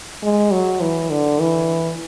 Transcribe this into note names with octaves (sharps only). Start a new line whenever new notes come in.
G#3
F#3
E3
D3
E3